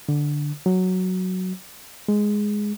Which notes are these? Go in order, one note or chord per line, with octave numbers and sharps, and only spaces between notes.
D3
F#3
G#3